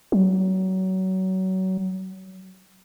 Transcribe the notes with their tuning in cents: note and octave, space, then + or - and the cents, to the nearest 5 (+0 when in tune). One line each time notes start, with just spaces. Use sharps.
F#3 +25